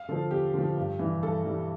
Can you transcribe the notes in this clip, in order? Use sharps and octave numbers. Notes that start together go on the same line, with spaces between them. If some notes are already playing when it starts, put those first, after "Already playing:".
Already playing: F5
D3 F3 A4
E2 G4
D3 F3
G2
E3 G3
G2 A4
E3 G3